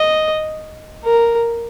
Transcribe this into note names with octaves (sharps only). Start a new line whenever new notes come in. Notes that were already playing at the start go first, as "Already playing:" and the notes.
Already playing: D#5
A#4